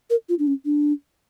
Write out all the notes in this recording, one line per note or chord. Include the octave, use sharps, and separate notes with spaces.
A#4
F4
D4
C#4
D4